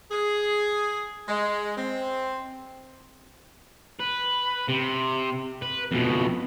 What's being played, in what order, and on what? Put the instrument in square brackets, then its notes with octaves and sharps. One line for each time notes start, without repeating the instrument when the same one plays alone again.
[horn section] G#4
G#3
C4
[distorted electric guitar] B4
C3
B4
F2 B2